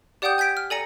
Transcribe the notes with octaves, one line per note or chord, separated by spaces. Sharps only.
G4 D5 F#5 G5 D#6 G6
G#5 G6 G#6 B6 D7
F6
A4 D5 G#5 A#5 A#6 C#7